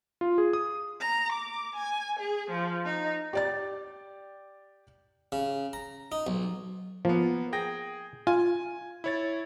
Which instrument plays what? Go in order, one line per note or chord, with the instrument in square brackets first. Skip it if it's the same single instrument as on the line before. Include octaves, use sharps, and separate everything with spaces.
[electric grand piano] F4
G#4
D#6
[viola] A#5
D6
G#5
G#4
F3
D#4
[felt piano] G4 D5 A6
[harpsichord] C#3
A#5
D#4
B1
[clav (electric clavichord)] F3 [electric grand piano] A#3 B3
[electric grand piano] G#4 G5 A#6
[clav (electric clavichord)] F4 [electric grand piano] G#5
[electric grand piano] E4 C#5 A6